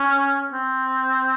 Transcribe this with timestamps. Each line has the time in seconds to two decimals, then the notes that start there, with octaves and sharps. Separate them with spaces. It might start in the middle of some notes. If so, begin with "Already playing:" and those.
Already playing: C#4
0.53 C4